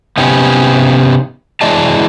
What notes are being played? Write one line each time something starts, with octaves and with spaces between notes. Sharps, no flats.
C3 B3 C#4 D#4 G4
E3 G#3 D5 D#5 A5